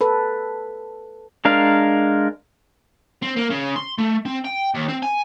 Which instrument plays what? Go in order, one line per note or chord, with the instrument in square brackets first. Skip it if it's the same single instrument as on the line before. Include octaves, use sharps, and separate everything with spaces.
[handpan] A4 B4
[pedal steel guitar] G#3 D4 A#4 F5
[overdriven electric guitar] C4
A#3
C#3
C6
A3
C4
G5
D#2
C4
G#5